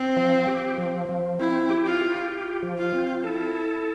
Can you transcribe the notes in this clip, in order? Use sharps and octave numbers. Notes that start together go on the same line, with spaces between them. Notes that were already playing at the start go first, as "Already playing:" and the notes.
Already playing: C4
F3
G4
F3
F3
C4 E4
G4
F4
G4
G4
F3
F4
C4
E4 A4
A4